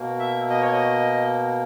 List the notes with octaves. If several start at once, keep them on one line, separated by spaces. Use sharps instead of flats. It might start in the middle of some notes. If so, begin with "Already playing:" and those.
Already playing: B2 A#3
E5
D#5
C#5
D#5